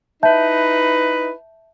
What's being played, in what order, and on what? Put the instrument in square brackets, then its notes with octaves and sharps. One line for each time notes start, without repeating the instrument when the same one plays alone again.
[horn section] D#4 E4 B4 [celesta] E5 A5 G6